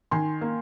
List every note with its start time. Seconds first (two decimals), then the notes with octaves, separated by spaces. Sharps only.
0.11 D#3 G#5 C6
0.41 A#3